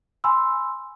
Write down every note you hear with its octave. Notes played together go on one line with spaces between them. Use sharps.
G#5 B5 C6 E6